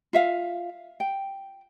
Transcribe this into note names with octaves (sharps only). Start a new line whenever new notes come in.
F4 E5 F5
G5